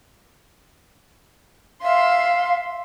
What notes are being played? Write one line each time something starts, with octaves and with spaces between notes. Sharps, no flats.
E5 F5 C6